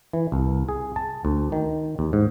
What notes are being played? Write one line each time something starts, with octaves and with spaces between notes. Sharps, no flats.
E3
C2
G#4
A5
D2
D#3
D#2
G#2